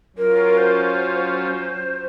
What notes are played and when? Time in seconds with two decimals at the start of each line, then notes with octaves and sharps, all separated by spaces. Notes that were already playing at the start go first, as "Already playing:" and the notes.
0.16 F#3 C#4 F4 A#4
0.57 C5